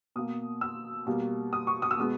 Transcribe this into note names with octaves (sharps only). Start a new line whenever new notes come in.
B2 A#3 D#6
E6
B2 G3 A#3
D#6
C#6
D#6
E6
B2 G#3 B3 D#6